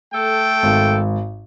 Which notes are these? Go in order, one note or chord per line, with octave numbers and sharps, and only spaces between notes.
A3 A4 G5
G#1